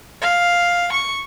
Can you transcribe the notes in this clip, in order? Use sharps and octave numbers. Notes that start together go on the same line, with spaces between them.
F5
C#6